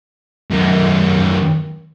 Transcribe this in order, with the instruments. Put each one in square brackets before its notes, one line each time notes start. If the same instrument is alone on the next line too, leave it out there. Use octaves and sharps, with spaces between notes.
[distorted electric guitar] F#2 D#3